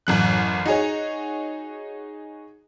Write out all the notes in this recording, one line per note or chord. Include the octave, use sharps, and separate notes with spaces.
A1 F#2 F#6
D#4 F#4 G#4 C#5